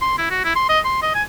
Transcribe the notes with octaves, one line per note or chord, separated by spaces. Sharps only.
C6
E4
F#4
E4
C6
D#5
C6
D#5
G#5